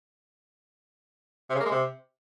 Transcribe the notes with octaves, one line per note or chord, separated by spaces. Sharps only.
C3
C#3
A#3
G#3
C3